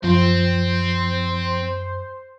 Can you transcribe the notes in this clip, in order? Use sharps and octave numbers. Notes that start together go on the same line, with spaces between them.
F#2 F3 C4 C5